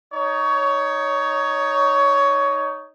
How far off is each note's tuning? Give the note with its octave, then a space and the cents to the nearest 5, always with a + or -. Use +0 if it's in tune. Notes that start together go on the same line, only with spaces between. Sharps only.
D#4 +0 C#5 +15